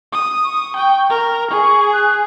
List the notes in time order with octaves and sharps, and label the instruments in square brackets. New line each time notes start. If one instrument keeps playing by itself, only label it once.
[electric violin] D#6
[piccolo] C#6
[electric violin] G5
A#4
[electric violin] G#4 [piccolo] C#6
[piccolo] F#6